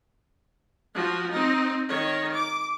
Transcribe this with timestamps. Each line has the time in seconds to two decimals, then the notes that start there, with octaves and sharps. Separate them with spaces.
0.95 F3 F#4
1.31 C4 D#4
1.89 D#3 C#5
2.34 D6